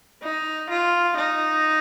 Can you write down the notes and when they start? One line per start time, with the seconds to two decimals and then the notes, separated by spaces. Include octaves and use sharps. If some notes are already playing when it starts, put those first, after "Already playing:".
0.23 D#4
0.70 F4
1.17 D#4